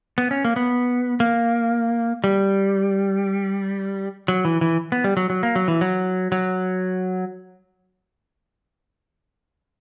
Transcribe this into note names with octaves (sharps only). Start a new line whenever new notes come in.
B3
C#4
A#3
B3
A#3
G3
F#3
E3
E3
B3
G3
F#3
F#3
A#3
F#3
E3
F#3
F#3